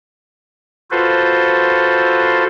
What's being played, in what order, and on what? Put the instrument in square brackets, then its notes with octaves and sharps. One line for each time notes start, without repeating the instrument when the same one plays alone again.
[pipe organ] F4 F#4 A4 B4 C5